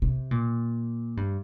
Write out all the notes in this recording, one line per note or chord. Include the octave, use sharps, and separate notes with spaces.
C3
A#2
G2